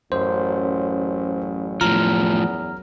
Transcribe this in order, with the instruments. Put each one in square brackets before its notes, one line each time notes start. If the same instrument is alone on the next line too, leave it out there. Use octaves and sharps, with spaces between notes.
[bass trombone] A1 [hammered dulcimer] F#2 [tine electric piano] C5
[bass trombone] E2 [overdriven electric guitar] A2 F3 [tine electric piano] A#5 F6